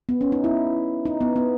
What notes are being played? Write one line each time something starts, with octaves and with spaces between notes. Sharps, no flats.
B3
C#4
D#4
E4
D#4
B3
B3